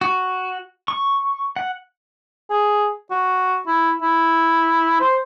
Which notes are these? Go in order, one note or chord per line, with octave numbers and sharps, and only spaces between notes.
F#4
C#6
F#5
G#4
F#4
E4
E4
C5